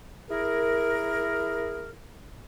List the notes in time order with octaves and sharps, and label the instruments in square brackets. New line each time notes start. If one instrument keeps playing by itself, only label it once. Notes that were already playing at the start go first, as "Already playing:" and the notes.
[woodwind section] E4 G#4 A#4